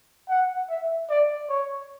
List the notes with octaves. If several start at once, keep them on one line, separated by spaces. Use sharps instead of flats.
F#5
E5
D5
C#5